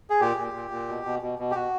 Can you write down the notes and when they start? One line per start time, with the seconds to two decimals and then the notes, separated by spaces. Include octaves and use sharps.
0.10 G#4
0.20 A#2 G4
0.37 A#2
0.53 A#2
0.71 A#2
0.88 B2
1.05 B2
1.22 B2
1.39 B2
1.51 G4
1.55 B2 F#4